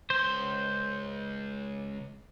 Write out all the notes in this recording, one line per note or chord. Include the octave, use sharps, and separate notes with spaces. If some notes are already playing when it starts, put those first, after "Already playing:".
C#2 C5 C6